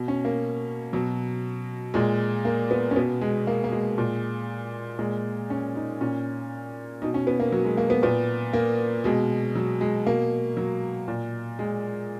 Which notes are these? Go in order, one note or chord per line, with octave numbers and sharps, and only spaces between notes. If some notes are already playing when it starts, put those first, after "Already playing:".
Already playing: B2
C#4
A#3
B2 F#3
A#2 G#3
A#3
B3
C#4
B2 B3
G#3
A#3
A#3
G#3
A#2
A#2 G#3
C#4
D#4
A#2 C#4
B2 D#4
C#4
B3
A#3
F#3
G#3
A#3
B3
A#2 B3
A#3
B2 G#3
F#3
G#3
B2 A#3
F#3
A#2
G#3